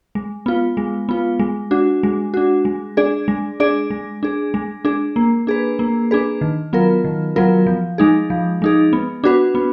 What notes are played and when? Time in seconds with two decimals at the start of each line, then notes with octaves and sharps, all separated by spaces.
0.15 G#3
0.46 B3 F4
0.77 G#3
1.09 B3 F4
1.39 G#3
1.71 D4 F#4
2.03 G#3
2.34 D4 F#4
2.65 G#3
2.97 D4 G#4 D5
3.28 G#3
3.60 D4 G#4 D5
3.90 G#3
4.23 D4 G#4
4.54 G#3
4.85 D4 G#4
5.16 A#3
5.47 D4 G#4 B4
5.79 A#3
6.11 D4 G#4 B4
6.41 D#3
6.73 F#3 B3 F4 A#4
7.04 D#3
7.36 F#3 B3 F4 A#4
7.67 F3
7.98 G#3 D#4 G#4
8.30 F3
8.62 G#3 D#4 G#4
8.93 B3
9.24 D4 F#4 B4
9.55 B3